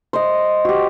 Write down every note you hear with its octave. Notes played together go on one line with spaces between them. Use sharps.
C5 D#5
F#4 G4